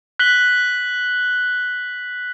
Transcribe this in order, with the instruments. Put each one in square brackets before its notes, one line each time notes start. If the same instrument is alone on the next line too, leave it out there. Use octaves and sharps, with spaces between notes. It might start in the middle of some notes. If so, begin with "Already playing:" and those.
[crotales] F#6 B6 F#7 G7